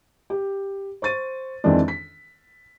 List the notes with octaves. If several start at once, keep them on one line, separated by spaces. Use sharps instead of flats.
G4
C5 C#6 A6 D#7
F2 D#3 E3 G#3 C4 D4
B6